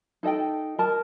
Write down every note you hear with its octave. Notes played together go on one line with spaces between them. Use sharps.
D#4 A4 D#5 G5
A#4 D#5 A5